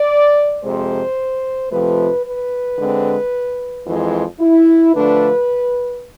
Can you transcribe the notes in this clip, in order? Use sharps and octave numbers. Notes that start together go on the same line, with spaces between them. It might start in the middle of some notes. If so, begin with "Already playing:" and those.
Already playing: D5
F2 C3 G#3 C5
F2 C3 F3 A3 B4
B4
D3 G#3 C4
F2 E3 G#3
E4
D3 F3 A3 D4 B4